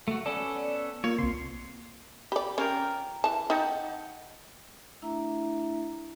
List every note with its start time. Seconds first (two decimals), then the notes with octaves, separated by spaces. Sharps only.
0.08 A3 F#4
0.26 B3 C#4 A4 D5
1.04 A#3 F4 C#5
1.19 C2 C3 C6
2.32 G4 D5 B5
2.58 C#4 F4 A#4 G5
3.24 E3 A5
3.50 D#4 F#5 G5 A5
5.02 A3 D4 E4 E5 A#5